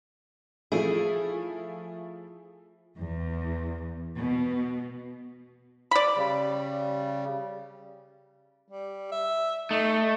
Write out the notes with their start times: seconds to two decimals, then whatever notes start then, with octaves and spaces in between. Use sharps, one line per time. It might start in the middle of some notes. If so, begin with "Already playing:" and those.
0.72 F3 A3 E4 G#4
2.98 E2
4.18 B2
5.91 D5 B5
6.17 C#3 G3
8.69 G3
9.11 E5
9.71 A3 D#4